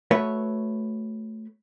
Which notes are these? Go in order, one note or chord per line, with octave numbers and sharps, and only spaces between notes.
A3 F#4 B4 C#5 E5